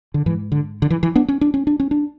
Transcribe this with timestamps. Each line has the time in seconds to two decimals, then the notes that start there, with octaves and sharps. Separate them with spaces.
0.14 D3
0.26 G#2 E3
0.52 D3
0.82 D3
0.90 E3
1.03 E3
1.15 B3 D4
1.28 C#4
1.41 D4
1.54 C#4
1.67 D4
1.80 C#4
1.91 D4